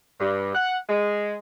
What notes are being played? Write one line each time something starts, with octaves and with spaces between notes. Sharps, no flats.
G2
F#5
G#3